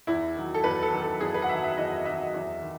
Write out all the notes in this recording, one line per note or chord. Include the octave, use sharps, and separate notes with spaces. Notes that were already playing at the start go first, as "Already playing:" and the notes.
E2 E4
D#3 F#3
A4
E2 B4
A4
D#3 F#3
A4
E2 G#4
B4
F#5
D#3 F#3 E5
E5
E2 D#5
D#3 F#3 E5
E2
D#3